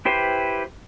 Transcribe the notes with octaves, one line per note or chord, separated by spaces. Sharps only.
E4 G4 B4 C5